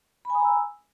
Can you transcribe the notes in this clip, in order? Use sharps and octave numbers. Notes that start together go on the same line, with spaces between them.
G#5 A#5 B5 D#6 E6